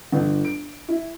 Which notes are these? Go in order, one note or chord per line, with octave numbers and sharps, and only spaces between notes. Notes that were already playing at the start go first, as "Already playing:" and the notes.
G1
D7
E4